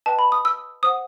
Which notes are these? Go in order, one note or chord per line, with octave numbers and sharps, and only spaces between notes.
B4 D#5 G5 A5
B5
D#6
E6
C5 F#5 D#6